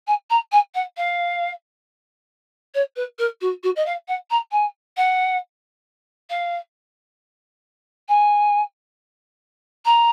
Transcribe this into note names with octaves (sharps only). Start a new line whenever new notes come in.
G#5
A#5
G#5
F#5
F5
C#5
B4
A#4
F#4
F#4
D#5
F5
F#5
A#5
G#5
F#5
F5
G#5
A#5